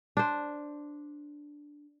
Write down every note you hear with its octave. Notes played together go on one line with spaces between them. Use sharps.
D4 C5